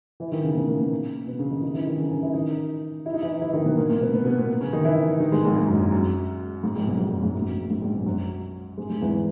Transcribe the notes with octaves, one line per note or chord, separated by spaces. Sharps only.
E3 E4
D#3 D#4
C#3 C#4
B2 B3
A#2 A#3
A#2 A#3
B2 B3
C#3 C#4
D#3 D#4
D#3 D#4
E3 E4
D#3 D#4
C#3 C#4
C#3 C#4
E3 E4
D#3 D#4
E4
D#4
E3 E4
E3 E4
D#3 D#4
B2 B3
A#2 A#3
A#2 A#3
B2 B3
B2 B3
B2 B3
A#2 A#3
C#3 C#4
D#3 D#4
E3 E4
D#3 D#4
G#2 G#3
A#1 A#2
G#2
F#2
F#2
F#2
G#2
A#1 A#2
B1 B2
A#1 A#2
F#2
G#2
F#2
A#1 A#2
G#2
A#1 A#2
B1 B2
F#2 F#3
G#2 G#3
G#2 G#3
E2 E3